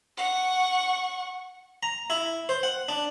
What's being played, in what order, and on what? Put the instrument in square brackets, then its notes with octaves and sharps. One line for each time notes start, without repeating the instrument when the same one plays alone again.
[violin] F#5 C#6
[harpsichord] A#5
E4
C5
F#5
D4